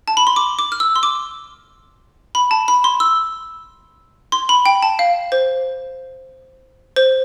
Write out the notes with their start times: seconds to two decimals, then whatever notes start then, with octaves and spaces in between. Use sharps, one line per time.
0.08 A5
0.17 B5
0.27 C6
0.36 D6
0.59 D6
0.72 F6
0.80 E6
0.96 C6
1.03 D6
2.35 B5
2.51 A5
2.68 B5
2.84 C6
3.00 E6
4.32 C6
4.49 B5
4.66 G5
4.83 A5
4.99 F5
5.32 C5
6.96 C5